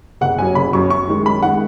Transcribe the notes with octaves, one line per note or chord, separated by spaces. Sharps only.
F#1 F#5
F#2 F#3 G#5
F#1 B5
F#2 F#3 C#6
F#2 C#6
D#3 G#3
F#2 B5
D#3 G#3 F#5